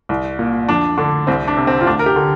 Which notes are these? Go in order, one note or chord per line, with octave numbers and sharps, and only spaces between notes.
C2
A#2
F2 D4
D3 D4
C2 C4
D4
C3
C4
F4
D2 D4
A#4
G4
D3